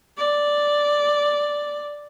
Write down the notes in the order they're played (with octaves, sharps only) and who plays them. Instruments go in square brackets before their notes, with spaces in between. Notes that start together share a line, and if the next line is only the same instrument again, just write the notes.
[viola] D5